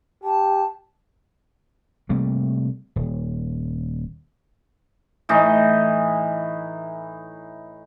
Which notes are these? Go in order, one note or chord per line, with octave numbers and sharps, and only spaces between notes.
G4 A5
C3 G3 A3 A#3
D#1
A2 E3 D#4